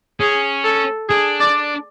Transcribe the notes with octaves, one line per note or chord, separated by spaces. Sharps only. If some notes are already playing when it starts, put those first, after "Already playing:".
C#4 G#4
A4
D4 G#4
D5